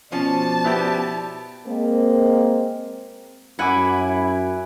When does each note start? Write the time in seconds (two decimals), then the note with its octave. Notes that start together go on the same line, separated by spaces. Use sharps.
0.12 B2 F3 C#4 C5 D5 A5
0.64 B3 E4 G4
1.66 G#3 A#3 C4
3.59 F#2 E4 F#5 G#5 D6